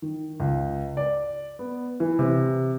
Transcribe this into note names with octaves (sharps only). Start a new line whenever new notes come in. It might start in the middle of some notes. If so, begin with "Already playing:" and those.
D#3
C#2
D5
B3
E3
C3